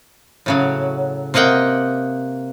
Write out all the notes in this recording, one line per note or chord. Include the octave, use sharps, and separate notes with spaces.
A2 C#3 F#3
C3 A#3 D#5 F#5 G5